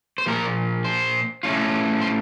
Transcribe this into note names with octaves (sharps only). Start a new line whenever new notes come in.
C5
A#2 F3 A#3 A#4
C5
A2 A3 C#4 F4
C5